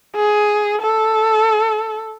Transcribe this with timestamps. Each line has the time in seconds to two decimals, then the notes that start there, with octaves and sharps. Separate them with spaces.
0.16 G#4
0.81 A4